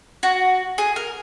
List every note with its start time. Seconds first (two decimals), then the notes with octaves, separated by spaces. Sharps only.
0.23 F#4
0.78 G#4
0.96 A#4